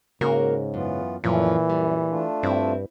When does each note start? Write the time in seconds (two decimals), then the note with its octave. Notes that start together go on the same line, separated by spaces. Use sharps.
0.21 G#2 C#3 A#3 F#4 A#4
0.74 F#2 E3 B3 F4
1.24 F#2 A#2 E3 F3 A3 C#4
1.70 F#2 G3
2.09 A3 D4 F4
2.43 G2 C4 E4